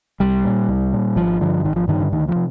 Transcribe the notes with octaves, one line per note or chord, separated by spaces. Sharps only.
C2 G3
A#2
C2
A#2
G#1 F3
G2 D3 F3
G#1 D#3
F3
G2 D3 D#3
D3
D2 D#3
F3
C3